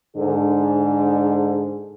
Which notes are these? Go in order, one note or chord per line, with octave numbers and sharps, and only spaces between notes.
G#2 D3 G#4